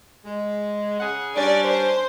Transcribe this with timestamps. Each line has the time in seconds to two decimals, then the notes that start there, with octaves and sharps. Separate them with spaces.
0.24 G#3
1.00 C#3 G#4 F#5
1.36 G3 C#4 D4 D5
1.67 C5